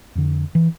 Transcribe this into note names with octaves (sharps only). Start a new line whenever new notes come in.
F2 D3
E3